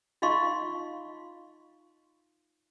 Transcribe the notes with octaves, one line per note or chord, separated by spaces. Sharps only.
D#4 F4 D#5 F5 C6 C#6